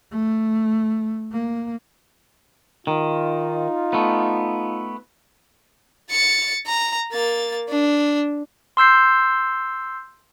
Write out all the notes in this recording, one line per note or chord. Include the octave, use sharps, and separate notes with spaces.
A3
A#3
D#3 D#4 F4
A3 B3
A6 C#7
A#5
A#3 A6
D4
C6 E6 G6 C7